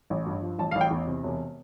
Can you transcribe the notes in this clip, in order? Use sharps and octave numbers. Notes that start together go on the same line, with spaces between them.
A1
G2
F3
A1 A5
F5
A1
G5
E2
C3
E1